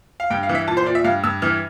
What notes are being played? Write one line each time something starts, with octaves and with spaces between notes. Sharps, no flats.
F5
G2 G5
F5
E3
E5
A#2 A5
C5
A#2 D5
E5
G2 F5
G2 E6
E3 F6